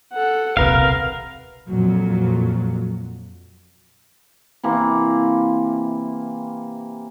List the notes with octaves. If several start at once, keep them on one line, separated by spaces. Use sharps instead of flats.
A4 F#5
D#1 B1 C3 A#4 B4 F5
F2 A#2 F#3
C3 E3 A#3